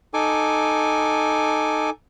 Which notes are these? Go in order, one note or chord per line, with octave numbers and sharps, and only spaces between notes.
D#4 A4 G#5 D6